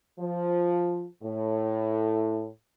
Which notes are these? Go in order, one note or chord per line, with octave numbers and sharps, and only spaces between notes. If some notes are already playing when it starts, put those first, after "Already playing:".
F3
A2